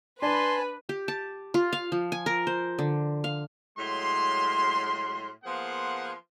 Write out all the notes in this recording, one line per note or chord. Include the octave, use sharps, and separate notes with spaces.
D4 B4 G#5 A5 C6
G4
A5
F4
F5
F3
G#5
A#4
C5
D3
F5
A2 F#3 G#3 C6
F3 A#3 B3 G#4 F#5 C6